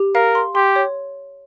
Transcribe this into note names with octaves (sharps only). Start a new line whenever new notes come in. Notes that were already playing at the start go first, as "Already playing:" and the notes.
Already playing: G4
A#4 F5
C6
G4 C6
C#5